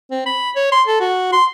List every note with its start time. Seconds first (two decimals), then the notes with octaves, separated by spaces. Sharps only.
0.11 C4
0.26 B5
0.56 C#5
0.72 C6
0.87 A4
1.00 F#4
1.32 C6